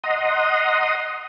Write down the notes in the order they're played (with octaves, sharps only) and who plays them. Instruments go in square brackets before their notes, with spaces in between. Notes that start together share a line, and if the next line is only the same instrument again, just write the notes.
[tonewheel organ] D#5 F#5 A#5 C6 D#6